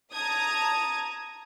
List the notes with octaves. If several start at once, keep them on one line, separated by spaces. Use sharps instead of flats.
A5 A#5 D#6 G#6